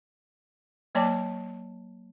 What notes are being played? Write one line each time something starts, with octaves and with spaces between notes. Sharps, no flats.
F#3 A#3 C#5 D5 A5 D6